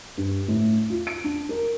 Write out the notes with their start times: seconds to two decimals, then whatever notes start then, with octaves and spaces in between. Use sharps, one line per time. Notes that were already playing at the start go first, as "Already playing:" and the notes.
0.18 G2
0.48 A2
0.90 F4
1.07 D7
1.24 D4
1.49 A#4